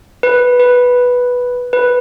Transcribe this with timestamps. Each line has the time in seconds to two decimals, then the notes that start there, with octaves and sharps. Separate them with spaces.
0.23 B4
0.60 B4
1.73 B4